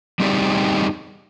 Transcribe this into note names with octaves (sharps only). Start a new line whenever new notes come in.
G3 C4 D#4 G4 G#4 D5